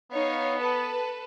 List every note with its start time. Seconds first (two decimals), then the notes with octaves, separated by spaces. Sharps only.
0.12 B3 D#4 C#5 F5
0.59 A4 B4 A5